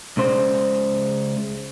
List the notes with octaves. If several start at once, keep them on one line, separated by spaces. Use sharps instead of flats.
C#2 C#3 C5